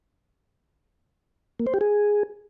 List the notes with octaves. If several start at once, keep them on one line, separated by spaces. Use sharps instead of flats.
A#3
C5
G4
G#4